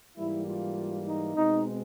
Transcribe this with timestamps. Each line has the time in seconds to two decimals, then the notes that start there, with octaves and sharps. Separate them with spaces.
0.18 G#2 E3 G3 A#3 E4
0.47 F4
1.06 D#4
1.36 B2 G#3 C4 D#4